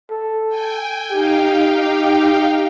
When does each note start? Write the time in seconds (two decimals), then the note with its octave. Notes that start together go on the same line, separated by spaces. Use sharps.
0.11 A4
0.49 G5 G#5
1.12 D#4 G4 F5 G5